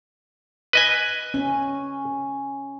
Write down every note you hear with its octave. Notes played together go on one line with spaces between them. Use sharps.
B4 D#5 G#5
C#4